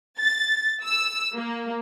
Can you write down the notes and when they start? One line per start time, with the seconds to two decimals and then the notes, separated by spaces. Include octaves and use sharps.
0.18 A6
0.85 E6
1.35 A#3